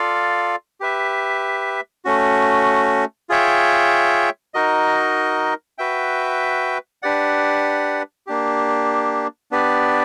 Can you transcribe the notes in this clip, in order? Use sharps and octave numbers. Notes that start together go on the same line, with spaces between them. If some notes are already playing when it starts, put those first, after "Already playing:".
Already playing: F4 A4 D5 F5
G4 B4 E5
A3 C#4 F#4
F4 G#4 C#5 E5 G5
D#4 F#4 A#4 D#5
F#4 B4 E5 G5
D4 G4 B4 D5 F#5
A#3 D4 G4
B3 D4 G4 B4 D5